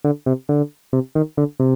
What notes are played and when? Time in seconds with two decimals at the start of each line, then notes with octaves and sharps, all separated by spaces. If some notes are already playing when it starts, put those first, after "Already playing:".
0.04 D3
0.26 C3
0.49 D3
0.93 C3
1.15 D#3
1.37 D3
1.60 C3